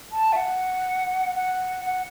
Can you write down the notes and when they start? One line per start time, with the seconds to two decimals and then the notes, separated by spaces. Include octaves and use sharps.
0.12 A5
0.33 E5
0.36 F#5
1.35 F#5
1.85 F#5